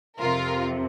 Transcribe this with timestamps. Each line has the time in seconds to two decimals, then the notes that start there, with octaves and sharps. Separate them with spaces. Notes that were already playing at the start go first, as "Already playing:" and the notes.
0.20 F2 C3 F3 F4 A#4